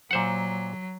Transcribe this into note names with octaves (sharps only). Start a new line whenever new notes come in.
A#2 F#3 C5 F#5